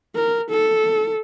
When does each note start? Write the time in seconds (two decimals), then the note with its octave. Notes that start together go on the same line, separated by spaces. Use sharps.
0.15 A#4
0.51 A4